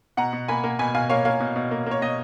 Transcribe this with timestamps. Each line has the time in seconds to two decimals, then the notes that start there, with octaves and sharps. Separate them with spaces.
0.17 B2 F#5 A#5
0.33 B2
0.48 A#3 G#5 B5
0.64 A#3
0.79 B2 G#5 B5
0.95 B2 F5 G#5
1.09 A#3 C#5 F5
1.25 A#3 C#5 F5
1.40 B2
1.56 B2
1.71 A#3
1.86 A#3 C#5
2.02 B2 D#5